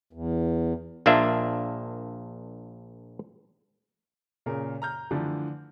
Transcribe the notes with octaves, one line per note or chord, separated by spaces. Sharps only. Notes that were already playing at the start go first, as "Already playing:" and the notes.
E2
A#1 A#3 D4 F4 E5
A#2 C#3 A#4
A#5 F6 G6
D3 E3 F3 A3 D4